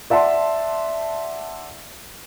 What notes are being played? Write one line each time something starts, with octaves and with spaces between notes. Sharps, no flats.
D5 E5 F#5 A5 C6